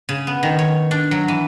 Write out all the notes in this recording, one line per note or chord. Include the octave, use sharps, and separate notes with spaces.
C#3
B3
D#3
C#5
D4
F#3
E3